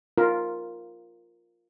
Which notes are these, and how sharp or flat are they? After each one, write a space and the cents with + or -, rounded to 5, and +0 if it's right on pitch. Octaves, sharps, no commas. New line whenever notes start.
F4 +0 A#4 +0